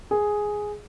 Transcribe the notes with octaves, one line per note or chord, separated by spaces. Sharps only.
G#4